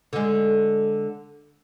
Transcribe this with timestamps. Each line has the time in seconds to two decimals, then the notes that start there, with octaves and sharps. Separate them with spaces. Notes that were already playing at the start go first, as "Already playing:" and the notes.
0.13 D3 G#3